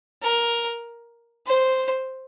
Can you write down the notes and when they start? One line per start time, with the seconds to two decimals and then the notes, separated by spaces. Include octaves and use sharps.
0.22 A#4
1.46 C5